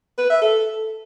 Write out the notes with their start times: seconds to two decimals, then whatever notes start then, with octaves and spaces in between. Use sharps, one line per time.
0.18 B4
0.30 E5
0.41 A4